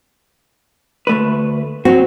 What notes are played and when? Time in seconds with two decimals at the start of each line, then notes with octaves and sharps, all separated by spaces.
1.07 D2 A3 B4
1.85 F#3 C4 F#4